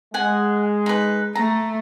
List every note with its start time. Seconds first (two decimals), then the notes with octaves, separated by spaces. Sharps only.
0.14 G#3 F#5 G#5
0.86 D#4 B4
1.35 A3 A#5